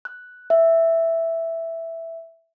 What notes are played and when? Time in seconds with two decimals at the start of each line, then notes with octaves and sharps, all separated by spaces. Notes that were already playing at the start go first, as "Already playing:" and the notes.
0.05 F#6
0.50 E5